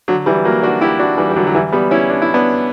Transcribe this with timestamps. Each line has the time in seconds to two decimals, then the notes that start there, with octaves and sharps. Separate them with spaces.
0.08 D3 F#3
0.26 E3 G3
0.45 F#3 A#3
0.63 D4 F#4
0.81 E4 G4
0.99 D4 F#4
1.18 E3 G3
1.30 G3
1.36 D3 F#3
1.47 F#3
1.55 E3 G3
1.73 G3 B3
1.91 C#4 E4
2.09 D4
2.22 E4
2.34 B3 D4